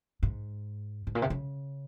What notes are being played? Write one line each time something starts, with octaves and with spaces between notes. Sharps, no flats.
G#2
G#2
A#2
C3
C#3